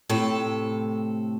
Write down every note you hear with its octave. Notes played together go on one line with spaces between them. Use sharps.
A2 C3 A4